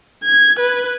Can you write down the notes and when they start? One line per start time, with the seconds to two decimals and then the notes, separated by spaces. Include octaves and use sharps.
0.24 G#6
0.60 B4